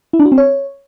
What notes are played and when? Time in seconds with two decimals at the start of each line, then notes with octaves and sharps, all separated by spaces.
0.13 E4
0.19 D4
0.26 F#4
0.32 C4
0.38 C#5